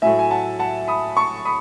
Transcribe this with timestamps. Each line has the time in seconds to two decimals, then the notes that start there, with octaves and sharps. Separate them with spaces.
0.02 A2 F#3 A3 E5 G#5
0.19 G#5
0.31 F#5 A5
0.59 F#5 A5
0.88 B5 D#6
1.17 A5 C#6
1.45 B5 D#6